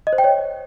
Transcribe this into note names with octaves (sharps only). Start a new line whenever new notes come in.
D#5
C5
G5
C#5